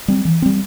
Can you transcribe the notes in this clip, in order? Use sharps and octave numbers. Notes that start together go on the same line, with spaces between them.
G3 C4
E3
G3 C4